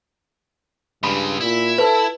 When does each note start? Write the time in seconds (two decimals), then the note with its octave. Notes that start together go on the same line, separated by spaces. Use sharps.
1.04 G2 C#3 G#3 B5
1.41 A#2 E4
1.78 A4 B4